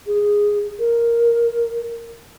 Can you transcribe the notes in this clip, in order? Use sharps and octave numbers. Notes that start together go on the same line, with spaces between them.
G#4
A#4